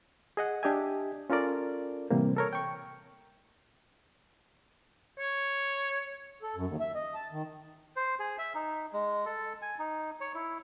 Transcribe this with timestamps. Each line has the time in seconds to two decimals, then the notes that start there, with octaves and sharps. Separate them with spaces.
0.37 G#4 D#5 F#5
0.63 D4 G4 D#5 E5 G#5
1.30 C#4 F4 A4 A#4 D5
2.10 A2 C3 E3 G3 A#3
2.36 A4 A#4 C#5
2.53 G5 C#6
5.18 C#5
6.43 A4
6.56 F#2
6.68 D#2
6.80 E5
6.95 D#5
7.15 A5
7.32 D#3
7.96 C5
8.19 G#4
8.38 E5
8.55 D#4
8.93 G#3
9.25 A4
9.62 G#5
9.79 D#4
10.21 C#5
10.35 E4